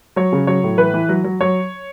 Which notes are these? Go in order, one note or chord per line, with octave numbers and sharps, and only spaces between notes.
F#3 C#5
C#3
F#3 C#5
A2
E3 B4
E3
F#3
F#3
F#3 C#5